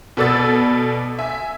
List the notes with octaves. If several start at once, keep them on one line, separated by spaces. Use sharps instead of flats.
B2 B3 A4 D5 E6 A6
E5 G#5